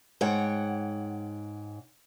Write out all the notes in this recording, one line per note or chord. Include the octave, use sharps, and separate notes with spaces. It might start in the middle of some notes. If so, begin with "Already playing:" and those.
G#2 C#5 F#5 G5